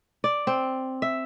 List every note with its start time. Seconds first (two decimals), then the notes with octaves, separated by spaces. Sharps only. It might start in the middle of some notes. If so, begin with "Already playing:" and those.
0.24 D5
0.47 C4
1.02 E5